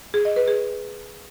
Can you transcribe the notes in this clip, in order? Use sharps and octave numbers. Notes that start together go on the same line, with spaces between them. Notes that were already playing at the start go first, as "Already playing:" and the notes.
G#4
D#5
B4
G#4